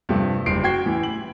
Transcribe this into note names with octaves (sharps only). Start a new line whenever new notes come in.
G2 C3 F3 A3
F#1 G3 G4 C7 D7
F#4 G5 G#6 C7
A2 E3
F#7